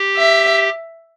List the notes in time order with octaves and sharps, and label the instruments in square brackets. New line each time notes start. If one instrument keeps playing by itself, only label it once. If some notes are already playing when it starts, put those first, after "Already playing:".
Already playing: [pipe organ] G4
[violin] E5